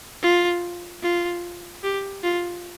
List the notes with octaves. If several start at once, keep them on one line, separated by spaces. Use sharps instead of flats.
F4
F4
G4
F4